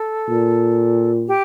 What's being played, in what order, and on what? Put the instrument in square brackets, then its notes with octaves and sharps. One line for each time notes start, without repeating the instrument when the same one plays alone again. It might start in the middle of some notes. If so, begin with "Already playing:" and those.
Already playing: [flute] A4
[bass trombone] A#2
[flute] G4